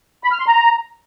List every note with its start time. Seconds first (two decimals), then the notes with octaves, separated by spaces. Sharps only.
0.24 B5
0.32 F6
0.39 C6
0.47 A#5